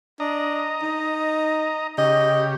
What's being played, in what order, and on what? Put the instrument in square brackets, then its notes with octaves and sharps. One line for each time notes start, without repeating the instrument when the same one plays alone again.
[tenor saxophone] D4 [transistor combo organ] D#5 A#5
[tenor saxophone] D#4
[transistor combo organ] C#3 G4 [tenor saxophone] D#5